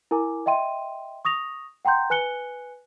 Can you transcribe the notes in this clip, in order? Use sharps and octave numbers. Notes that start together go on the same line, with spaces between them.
E4 A#4 G#5 D6
D#5 E5 G5 C6 D#7
C#6 D#6 A#6 F7
F#5 G5 A#5 C6 G6
B4 G#5 F#6 C#7 G7